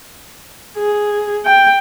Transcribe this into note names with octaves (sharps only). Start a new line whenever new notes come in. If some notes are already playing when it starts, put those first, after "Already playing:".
G#4
G5